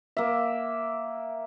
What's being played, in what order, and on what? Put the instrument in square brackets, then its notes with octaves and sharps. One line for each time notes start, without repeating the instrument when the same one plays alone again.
[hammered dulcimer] A#3 E5